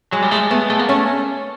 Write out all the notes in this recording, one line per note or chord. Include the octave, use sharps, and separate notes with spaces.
F#3 G#3
G3
G#3 A3
A3 B3
G#3 A3
A#3
A3 C#4